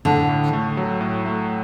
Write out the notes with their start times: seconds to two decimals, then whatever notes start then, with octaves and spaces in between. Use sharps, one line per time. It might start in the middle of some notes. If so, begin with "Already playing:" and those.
0.05 A2 D3
0.29 A2
0.53 A3
0.77 F#3
1.01 A2
1.26 A3